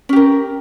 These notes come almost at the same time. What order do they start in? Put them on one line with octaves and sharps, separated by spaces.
C#4 G4 A#4